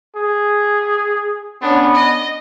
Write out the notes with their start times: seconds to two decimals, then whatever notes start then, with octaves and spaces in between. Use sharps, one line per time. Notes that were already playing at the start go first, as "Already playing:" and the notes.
0.16 G#4
1.62 B3 C#4 D4
1.94 D#5